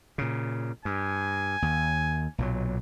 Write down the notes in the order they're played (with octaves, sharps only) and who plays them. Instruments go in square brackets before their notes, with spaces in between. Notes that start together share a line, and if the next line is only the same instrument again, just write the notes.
[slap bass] A#2 C#3
[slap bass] G2 [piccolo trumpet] G#5
[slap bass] D#2
B1 A#2 F#3